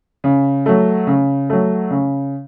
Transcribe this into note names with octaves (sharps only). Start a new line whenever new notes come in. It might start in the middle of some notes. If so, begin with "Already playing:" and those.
C#3
F#3 A3
C#3
F#3 A3
C#3